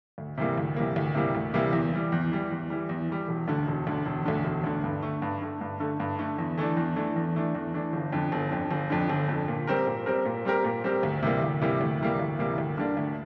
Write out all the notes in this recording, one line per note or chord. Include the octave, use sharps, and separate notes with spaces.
D2
C3 E3 G3 A#3
D2
C3 E3 G3 A#3
D2
C3 E3 G3 A#3
D2
C3 E3 G3 A#3
E2
E3 G3
E2
E3 G3
E2
E3 G3
E2
E3 G3
E1
D2 D3
E1
D2 D3
E1
D2 D3
E1
D2 D3
G2
D3 A3
G2
D3 A3
G2
D3 A3
G2
D3 A3
E2
E3 A3 D4
E2
E3 A3 D4
E2
E3 A3 D4
E2
E3 A3 D4
G1
F2 D3
G1
F2 D3
G1
F2 D3
G1
F2 D3
A#2
G3 C4 G4 A#4
A#2
G3 C4 G4 A#4
A#2
G3 C4 G4 A#4
A#2
G3 C4 G4 A#4
D2
C3 E3 G3 A#3
D2
C3 E3 G3 A#3
D2
C3 E3 G3 A#3
D2
C3 E3 G3 A#3
D2
D3 G3 A#3 D4
D2